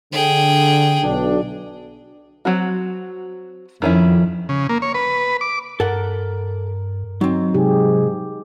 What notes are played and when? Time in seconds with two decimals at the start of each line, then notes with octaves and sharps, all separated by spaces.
0.13 D3 G#4 G5
1.03 B1 D4
2.45 F#3 C4 F#4
3.82 F2 D#3 C#4 E4
4.49 C#3
4.69 A#3
4.82 C#5
4.94 B4
5.41 D6
5.80 G2 A4 A#4 F#5
7.21 F#3 C4 D#4
7.54 G#2 C3 G4 G#4